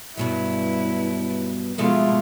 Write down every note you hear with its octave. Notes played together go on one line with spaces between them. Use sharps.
G2 B2 F#3 E4
B2 F3 G#3 A3 F4